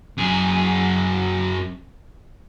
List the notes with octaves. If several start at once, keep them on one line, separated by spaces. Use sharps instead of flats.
F#2 G#4